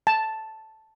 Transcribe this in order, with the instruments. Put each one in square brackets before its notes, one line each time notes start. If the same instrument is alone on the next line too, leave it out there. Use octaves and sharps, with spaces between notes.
[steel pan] A5